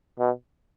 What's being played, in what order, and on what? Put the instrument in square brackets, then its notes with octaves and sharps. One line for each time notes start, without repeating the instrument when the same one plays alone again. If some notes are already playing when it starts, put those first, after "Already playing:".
[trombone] B2